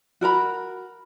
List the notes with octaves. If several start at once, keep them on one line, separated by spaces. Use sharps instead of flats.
F#4 A#4 A#5 B5